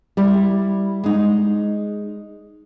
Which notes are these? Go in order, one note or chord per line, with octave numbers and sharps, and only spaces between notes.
G3 E4
G#3 D#4